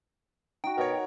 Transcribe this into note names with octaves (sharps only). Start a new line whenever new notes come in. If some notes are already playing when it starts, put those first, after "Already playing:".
D#4 F#4 G5
B2 A#4 C#5